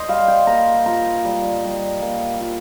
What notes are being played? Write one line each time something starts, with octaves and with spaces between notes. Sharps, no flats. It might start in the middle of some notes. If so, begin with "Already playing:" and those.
Already playing: C5 D#5
G3 F5
G5
A#3 A#5
F4 A#5
G3
G3
A#3
F4